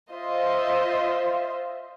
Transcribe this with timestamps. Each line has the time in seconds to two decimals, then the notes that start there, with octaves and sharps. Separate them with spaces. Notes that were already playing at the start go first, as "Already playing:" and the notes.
0.11 F4 C5 D#5 E5